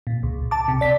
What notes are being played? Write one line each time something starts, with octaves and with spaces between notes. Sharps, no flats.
A#2
C#2
A5 D6
C3
D5 B6